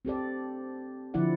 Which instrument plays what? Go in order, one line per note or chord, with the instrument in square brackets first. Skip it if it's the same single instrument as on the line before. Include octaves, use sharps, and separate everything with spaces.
[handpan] C4 G4 A4 D5
D3 F3 E4 D5 F#5